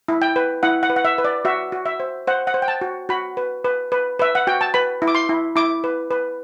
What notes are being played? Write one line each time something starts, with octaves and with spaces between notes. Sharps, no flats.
E4
G5
B4
E4 F#5
F#5
B4
F#5
E5
B4
D5
F#4 E5
F#4
E5
C5
C5 F#5
F#5
C5
G5
A5
F#4
F#4 B5
B4
B4
B4
B4 E5
F#5
F#4 G5
A5
B4 B5
E4
D6
C6
E4
E4 D6
B4
B4